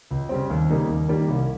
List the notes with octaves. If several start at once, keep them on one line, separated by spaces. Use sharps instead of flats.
C#2
C#3 G3 C4
D#2
C#3 G3 A#3 D#4
D#2
D#3 G3 A#3
C2